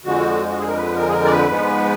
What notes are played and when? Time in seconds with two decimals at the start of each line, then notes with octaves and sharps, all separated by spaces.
0.05 F2 D3 F3 G#3 F#4
0.49 F#4
0.58 G#4
0.67 A#4
0.76 B4
0.95 A#4
1.09 G#4
1.13 A#4
1.25 D5
1.31 B4
1.49 G#2 F3 G#3 B3